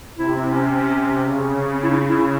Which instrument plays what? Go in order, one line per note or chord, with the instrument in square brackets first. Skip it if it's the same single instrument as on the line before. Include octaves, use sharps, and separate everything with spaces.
[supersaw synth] C3 [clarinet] E4
[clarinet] C4
C#4
[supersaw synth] C#3
[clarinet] C4
E4
D#4
E4